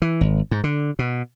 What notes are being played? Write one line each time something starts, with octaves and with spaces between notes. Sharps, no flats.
E3
G#1
G#2
D3
B2